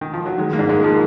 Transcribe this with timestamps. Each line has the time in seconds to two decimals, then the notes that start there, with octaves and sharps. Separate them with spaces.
0.01 D#3
0.14 F3
0.26 F#3
0.38 D#3 G#3
0.53 A#3
0.59 G#2
0.69 G#3
0.79 A#3
0.84 F3